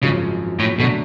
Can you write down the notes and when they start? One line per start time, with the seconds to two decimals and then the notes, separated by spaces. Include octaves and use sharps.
0.02 G#1 F#2 C#3 F3 G#3
0.59 A2
0.78 B2 D3 F#3 A3